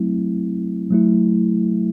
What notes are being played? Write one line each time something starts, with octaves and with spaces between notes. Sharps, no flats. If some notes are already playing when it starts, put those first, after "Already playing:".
Already playing: F#3 A3 C4 E4
F#3 A3 E4